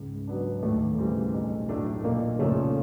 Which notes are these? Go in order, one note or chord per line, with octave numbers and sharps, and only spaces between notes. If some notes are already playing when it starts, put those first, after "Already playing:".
Already playing: C#2 G#2 G#3
B2 F#3 B3 D4
D#2 A2 A3
C#3 E3 G3 C4
B1
A2 F#3 A3 D4
B1 A#2 A#3
A#2 C#3 F3 A3 C#4